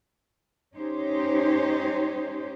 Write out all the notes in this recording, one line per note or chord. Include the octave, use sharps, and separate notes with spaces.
G#3 C#4 D#4 G4 C5 C#5